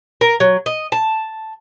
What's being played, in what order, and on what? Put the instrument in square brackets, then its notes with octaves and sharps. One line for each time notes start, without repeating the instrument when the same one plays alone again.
[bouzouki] A#4
F#3
D#5
A5